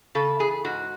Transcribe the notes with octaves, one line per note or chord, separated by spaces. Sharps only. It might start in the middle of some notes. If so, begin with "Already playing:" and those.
C#3 A4
E3 G#4
G#2 F#4